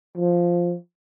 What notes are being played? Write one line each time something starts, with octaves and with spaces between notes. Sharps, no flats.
F3